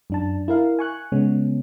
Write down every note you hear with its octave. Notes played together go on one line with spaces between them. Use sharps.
F#2 D4 A5
E4 A#4 F5
G#5 C#6 F#6
C#3 G#3 B3 C#4